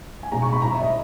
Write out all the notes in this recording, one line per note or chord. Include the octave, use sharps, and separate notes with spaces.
G#5
B1 B2 G#3 A#5
C#6
B5
G#1 G#2 F#3 A#5
E5
D#5